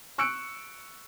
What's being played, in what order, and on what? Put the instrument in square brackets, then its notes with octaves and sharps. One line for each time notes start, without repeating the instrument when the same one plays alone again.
[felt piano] C#6 E6 F#6 C#7 D7